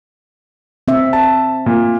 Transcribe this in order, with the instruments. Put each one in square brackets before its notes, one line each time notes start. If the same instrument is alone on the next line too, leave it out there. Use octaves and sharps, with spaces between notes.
[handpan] C4 E5
[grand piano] A5
A#2